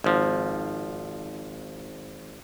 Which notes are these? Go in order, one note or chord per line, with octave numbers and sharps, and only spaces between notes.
G#1 F3